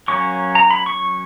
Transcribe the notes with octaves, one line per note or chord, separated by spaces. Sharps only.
F#3 A#3 C#4 C#6
A#5
B5
C#6